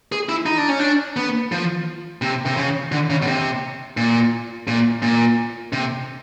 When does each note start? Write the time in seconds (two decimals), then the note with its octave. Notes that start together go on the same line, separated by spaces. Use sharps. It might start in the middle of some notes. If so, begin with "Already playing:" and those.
0.12 G#4
0.29 E4
0.46 D#4
0.58 D4
0.68 C#4
0.79 D4
1.17 B3
1.52 F3
2.22 C3
2.45 C3
2.57 C#3
2.92 D3
3.10 C#3
3.22 B2
3.27 C3
3.97 A#2
4.68 A#2
5.02 A#2
5.73 C3